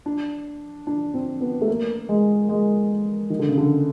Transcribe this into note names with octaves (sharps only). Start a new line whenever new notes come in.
D4
D4
C4
B3
A3
A#3
G#3
G#3
D#3
D3
C#3
D3